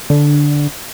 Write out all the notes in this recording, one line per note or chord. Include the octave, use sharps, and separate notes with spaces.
D3